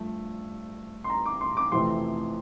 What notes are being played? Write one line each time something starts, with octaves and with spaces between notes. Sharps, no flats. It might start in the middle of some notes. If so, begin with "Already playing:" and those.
Already playing: G2 F3 A3
C6
A#5
D6
C6
D6
F2 C3 E3 A3 C4 C6